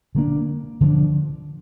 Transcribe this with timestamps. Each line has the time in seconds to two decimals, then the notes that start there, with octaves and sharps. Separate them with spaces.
0.15 D3 F3 A#3 D4
0.81 D3 F3 A#3 D4